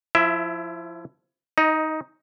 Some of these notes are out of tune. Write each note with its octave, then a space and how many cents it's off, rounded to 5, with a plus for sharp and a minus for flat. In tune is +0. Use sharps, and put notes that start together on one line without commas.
F3 +5 E4 +25 E5 +0
D#4 +10 D#5 -10